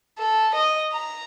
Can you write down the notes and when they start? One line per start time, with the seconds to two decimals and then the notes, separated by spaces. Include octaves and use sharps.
0.18 A4
0.55 D#5
0.92 A#5